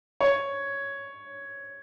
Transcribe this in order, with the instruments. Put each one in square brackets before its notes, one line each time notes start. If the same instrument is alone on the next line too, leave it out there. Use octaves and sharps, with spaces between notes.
[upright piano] C#5